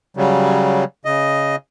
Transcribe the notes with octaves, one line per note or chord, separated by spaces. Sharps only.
C#3 F#3 G3
C#3 D#5